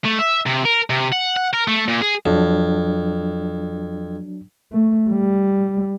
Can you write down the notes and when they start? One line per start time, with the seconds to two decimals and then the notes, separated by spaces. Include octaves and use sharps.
0.05 A3
0.19 E5
0.47 C3
0.65 A#4
0.90 C3
1.12 F#5
1.36 F#5
1.53 A#4
1.68 A3
1.89 A#2
2.02 G#4
2.26 F2 F#3 D4
4.72 A3
5.10 G3